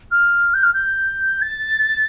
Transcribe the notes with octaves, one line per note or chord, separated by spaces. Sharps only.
F6
G6
F6
G6
A6